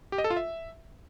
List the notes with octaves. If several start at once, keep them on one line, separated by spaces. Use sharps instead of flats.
G4
D#5
A4
F4
E5